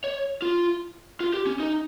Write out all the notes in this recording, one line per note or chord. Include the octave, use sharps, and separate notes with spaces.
C#5
F4
F4
G4
C#4
D#4